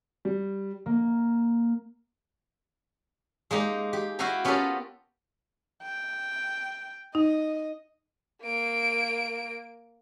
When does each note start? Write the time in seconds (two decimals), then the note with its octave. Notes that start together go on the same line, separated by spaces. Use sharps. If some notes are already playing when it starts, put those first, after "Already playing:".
0.25 G3
0.86 A#3
3.51 G#3 A#3 D#4 G4
3.93 G4
4.19 E4 F#4 F5 G5 G#5 A#5
4.45 B3 C#4 F4 G4 A4 A#4
5.83 G5
7.15 D#4 D#5
8.43 A#3 D7